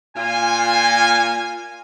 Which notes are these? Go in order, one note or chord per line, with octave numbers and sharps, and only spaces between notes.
A#2 F4 G#5